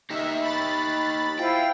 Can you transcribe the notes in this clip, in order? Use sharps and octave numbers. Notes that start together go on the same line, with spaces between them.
D#4 G4 E5
B5 A6
E4 F4 C5 G5